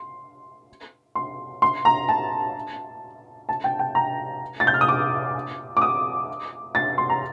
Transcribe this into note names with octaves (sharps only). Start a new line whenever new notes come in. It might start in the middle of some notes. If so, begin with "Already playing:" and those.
Already playing: C6
C6
C6
A#5
A5
A5
G5
G5
A#5
A6
G6
F6
D#6
D6
D6
D#6
A6
C6
A#5